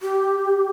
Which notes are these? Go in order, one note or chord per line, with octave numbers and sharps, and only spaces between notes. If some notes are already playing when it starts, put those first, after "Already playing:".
G4